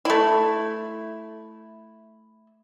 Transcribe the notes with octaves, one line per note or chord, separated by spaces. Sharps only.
A3 E4